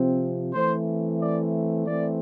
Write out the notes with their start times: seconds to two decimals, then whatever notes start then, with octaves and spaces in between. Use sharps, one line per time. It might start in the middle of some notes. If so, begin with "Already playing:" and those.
Already playing: C3 F3 C4
0.54 E3 A3 C4 C5
1.21 D5
1.87 E3 A3 C4 D5